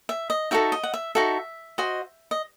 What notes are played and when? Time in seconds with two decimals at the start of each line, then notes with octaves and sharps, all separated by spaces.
0.09 E5
0.30 D#5
0.51 D#4 F#4 A4 E5
0.72 D#5
0.83 F#5
0.94 E5
1.15 D#4 F#4 A4 E5
1.78 F#4 C5 D#5
2.31 D#5